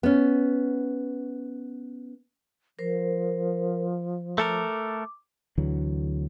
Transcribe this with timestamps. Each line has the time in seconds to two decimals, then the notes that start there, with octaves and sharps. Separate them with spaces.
0.03 B3 C#4
2.79 F3 A#4 C5
4.38 A3 A4 A#4 D6
5.58 D2 D3 E3 F#3